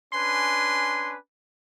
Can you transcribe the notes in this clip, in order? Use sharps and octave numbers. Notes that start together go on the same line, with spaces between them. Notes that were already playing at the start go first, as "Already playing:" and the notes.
C#4 D4 B4 G#5 C6